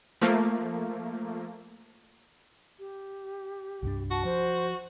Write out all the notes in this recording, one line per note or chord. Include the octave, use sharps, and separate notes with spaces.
F3 A3 A#3
G4
C2 G2 D4
F#4 A5
F3 C5